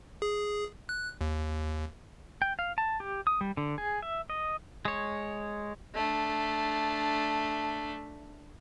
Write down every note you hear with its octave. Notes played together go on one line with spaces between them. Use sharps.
G#4
F#6
D#2
G5
F5
A5
G4
D#6
G3
D3
G#4
E5
D#5
G#3 C#5
A3 D4